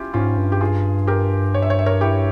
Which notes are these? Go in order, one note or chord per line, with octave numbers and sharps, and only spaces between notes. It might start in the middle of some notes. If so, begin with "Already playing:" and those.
Already playing: C#4 E4 F4 G4
G#2 C#4 F4
G2
G4
F4 G#4
G4 A#4
C#5
E5
C#5
E5
A#4 C#5
E4 G4